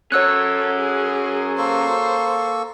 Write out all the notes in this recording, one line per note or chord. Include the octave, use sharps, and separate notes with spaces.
C#4 F#4 A4 C#5 E6 F#6
G#4
A#3 A4 C5 C#6